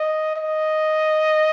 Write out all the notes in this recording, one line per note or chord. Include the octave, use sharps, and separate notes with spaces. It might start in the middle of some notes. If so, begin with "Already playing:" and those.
Already playing: D#5
D#5